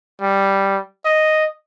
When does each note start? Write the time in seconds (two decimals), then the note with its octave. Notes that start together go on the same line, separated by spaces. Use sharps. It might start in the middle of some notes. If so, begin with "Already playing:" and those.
0.21 G3
1.05 D#5